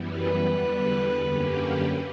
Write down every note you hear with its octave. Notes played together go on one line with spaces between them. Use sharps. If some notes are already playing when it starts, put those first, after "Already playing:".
Already playing: F#2 E3 G3 B3
B4
E2 D3 G3 B3
F#2 D3 A#3 C#4 G4